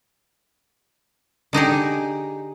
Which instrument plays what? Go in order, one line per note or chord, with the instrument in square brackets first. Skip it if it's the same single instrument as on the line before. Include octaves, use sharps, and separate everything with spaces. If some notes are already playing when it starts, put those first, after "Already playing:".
[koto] D3 D#4 G4 G#4